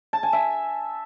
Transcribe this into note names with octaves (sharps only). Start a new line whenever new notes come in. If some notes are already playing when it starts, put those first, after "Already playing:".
A5
G#5
E5